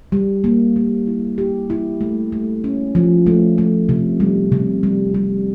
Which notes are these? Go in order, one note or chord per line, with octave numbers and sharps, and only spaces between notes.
G3
A#3
A#3
E4
G4
E4
A3
A3
C#4
F3
A3
A3
C3
G3
C3
G3
G3